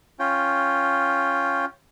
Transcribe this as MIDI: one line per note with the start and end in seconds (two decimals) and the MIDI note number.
0.19 1.65 61
0.19 1.65 65
0.19 1.65 79